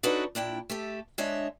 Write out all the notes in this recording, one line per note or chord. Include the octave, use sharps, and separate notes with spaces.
D4 D#4 F#4 A4 B4 C#5
A#2 D4 E4 G5
A3 G4 A4
G#3 D4 C#5 D#5 E5